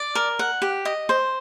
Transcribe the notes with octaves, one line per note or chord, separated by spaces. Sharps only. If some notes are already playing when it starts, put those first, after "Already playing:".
Already playing: D5
A#4
F#5
G4
D#5
C5